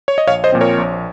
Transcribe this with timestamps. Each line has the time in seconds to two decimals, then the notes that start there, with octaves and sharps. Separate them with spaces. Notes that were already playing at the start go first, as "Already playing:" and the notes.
0.08 C#5
0.18 D#5
0.27 A#1 C#5 F5
0.44 C5 D#5
0.52 A#2 F3 C4
0.61 A#4 C#5
0.78 A#1